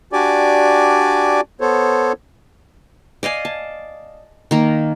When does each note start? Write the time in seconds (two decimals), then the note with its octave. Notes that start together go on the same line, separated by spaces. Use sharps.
0.13 D4 F#4 G4 D5 G#5 D6
1.61 B3 A4 C5 C#5
3.23 D5 D#5 F5 G#5
3.45 A5
4.51 D#3 A#3 A#5